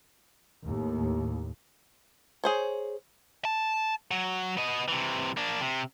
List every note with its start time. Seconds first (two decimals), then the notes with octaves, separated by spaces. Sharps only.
0.65 D#2 A2
2.44 G#4 C5 C#5
3.45 A5
4.11 F#3
4.57 B3 D#5
4.88 C3 E3
5.37 A#3 D4
5.61 C3